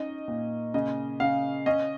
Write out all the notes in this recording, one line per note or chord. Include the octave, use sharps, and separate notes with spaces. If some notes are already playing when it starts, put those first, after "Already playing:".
Already playing: C#4 D#4 D#5
A#2
C#3 D#5
C#3 F5
C#4 D#5